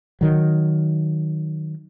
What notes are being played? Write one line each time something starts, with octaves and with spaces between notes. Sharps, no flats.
D#3 F#3